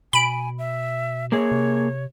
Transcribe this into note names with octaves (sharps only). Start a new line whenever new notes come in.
B2 G#5 B5 D7
E5
A#3 G#4 C#5
C3